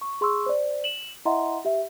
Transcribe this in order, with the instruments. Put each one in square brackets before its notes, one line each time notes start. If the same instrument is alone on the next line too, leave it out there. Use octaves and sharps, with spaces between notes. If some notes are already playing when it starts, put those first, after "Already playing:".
[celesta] C#6
G#4 C6 C#6 E6
C5 D5
E7 F#7
E4 D#5 E5 F#5 A#5 C6
G4 E5